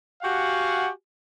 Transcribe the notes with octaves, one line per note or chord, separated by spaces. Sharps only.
F#4 G4 F5 F#5 G#5